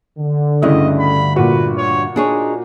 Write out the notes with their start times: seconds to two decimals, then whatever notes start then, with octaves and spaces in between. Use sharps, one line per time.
0.19 D3
0.62 D2 G2 C#3 E4 D#5
0.99 B5
1.36 A#2 F#4 B4
1.77 C#5
2.16 D4 D#4 G#4 C#5